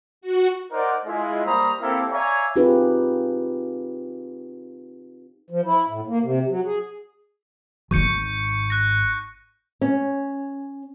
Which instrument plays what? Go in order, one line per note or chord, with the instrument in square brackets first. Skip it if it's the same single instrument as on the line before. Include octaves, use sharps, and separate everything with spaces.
[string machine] F#4
[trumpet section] D#4 A#4 C5 D5 F#5
G#3 E4 F4
G3 A#3 C5 A#5 B5 D#6
A#3 C4 E4 G4 A4 A#4
C#5 D5 E5 F5 G#5 A#5
[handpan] C4 D#4 F4 G4 G#4 B4
[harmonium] F3
E4
A2
A#3
C3
F#3
G#4
[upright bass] G#1 D#4 [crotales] C#6 G6 C#7
[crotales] F#6 A#6
[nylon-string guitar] C#4